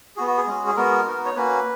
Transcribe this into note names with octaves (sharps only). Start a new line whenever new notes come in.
B3 F#4 G#4
F#4
G#4
G#3 C#4 F#4
G#4
G#3 B3 F#4 A#4
B3 D#4 F#4
C#5
A#3 C#4 F#4 B4